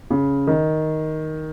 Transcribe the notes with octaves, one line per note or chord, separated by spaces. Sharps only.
C#3
D#3